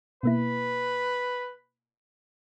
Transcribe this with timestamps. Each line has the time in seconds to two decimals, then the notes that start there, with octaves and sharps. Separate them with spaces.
0.23 B2 A#3 E4 B4